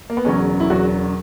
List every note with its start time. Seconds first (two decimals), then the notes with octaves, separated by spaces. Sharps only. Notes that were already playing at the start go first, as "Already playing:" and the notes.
0.10 A#3
0.17 B3
0.25 E1 E2 C#3 F#3 C#4
0.60 E4
0.70 E1 E2 C#3 F#3 F#4